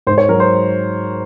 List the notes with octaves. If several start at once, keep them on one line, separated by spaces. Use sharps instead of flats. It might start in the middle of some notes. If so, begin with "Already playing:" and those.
G#2 C5
C#5
F#3 A#4
C5